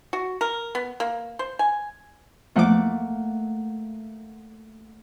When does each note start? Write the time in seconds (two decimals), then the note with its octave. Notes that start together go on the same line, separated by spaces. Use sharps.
0.13 F#4
0.41 A#4
0.75 B3
1.00 A#3
1.39 C5
1.59 G#5
2.56 E2 F3 A3 A#3 F#5 D6